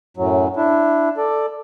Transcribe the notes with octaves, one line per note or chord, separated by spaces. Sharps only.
F#2 A2 F#3
D4 E4
A4 D5